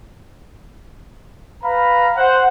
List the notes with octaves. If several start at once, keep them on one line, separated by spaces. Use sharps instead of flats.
B4 F5 A#5 B5
C5 F#5